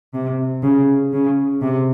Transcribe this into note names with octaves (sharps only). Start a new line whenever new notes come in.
C3
C#3
C#3
C3